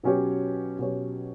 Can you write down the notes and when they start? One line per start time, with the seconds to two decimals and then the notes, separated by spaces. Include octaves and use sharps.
0.03 B2 F#3 C#4 G4 C#5
0.79 B2 F#3 C#4 G4 C#5